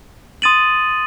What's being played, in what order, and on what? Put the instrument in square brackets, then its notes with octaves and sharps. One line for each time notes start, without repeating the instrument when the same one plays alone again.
[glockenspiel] C6 D#6 A6 D#7 F#7